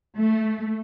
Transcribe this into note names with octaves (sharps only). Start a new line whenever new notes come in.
A3